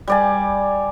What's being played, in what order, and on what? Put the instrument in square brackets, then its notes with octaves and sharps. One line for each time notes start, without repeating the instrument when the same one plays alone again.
[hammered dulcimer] G3 D5 G#5